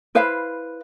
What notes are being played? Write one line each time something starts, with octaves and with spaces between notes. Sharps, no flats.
E4 B4 C5 F5